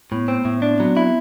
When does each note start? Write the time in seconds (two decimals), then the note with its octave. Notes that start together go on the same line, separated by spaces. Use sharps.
0.11 A2 B3
0.28 C4
0.45 A2
0.62 D4
0.71 C4
0.80 F#3 B3
0.97 C4 E4